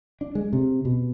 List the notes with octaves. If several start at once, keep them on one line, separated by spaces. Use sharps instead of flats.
D4
G#3
C3
B2